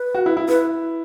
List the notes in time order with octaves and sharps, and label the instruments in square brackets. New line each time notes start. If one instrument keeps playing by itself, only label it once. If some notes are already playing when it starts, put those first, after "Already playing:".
Already playing: [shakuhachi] B4
[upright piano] F#4
E4
E4
[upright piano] E4 [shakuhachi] B4